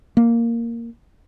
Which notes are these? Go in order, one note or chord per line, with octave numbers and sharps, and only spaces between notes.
A#3